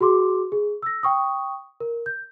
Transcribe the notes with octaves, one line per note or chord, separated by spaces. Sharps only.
F#4 G#4 C6 D6
G#4
E6 A#6
G5 C#6 D#6
A#4
G6